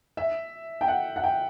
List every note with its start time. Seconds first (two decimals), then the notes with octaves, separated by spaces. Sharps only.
0.17 E5
0.81 G5
0.88 F#5
1.16 F#5
1.24 G5